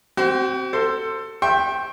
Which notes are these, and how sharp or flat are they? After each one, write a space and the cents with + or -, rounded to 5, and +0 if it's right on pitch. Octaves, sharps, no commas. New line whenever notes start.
C4 +0 F#4 +40
A4 +20 C5 +0
E5 +0 G5 +0 C#6 -45